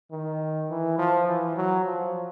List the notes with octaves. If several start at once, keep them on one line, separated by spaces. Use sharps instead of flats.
D#3
E3
F3
E3
F#3
F3